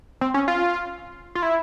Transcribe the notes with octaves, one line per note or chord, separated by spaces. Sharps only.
C4
C#4
F4
F4
E4